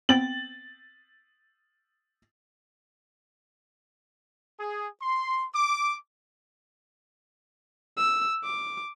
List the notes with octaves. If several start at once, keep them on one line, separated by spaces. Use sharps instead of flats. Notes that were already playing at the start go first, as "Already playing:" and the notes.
B3 C4 G5 A6 F#7
G#4
C6
D6
E6
D6